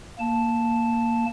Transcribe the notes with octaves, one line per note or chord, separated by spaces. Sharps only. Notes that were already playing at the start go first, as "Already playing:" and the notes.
A#3 A5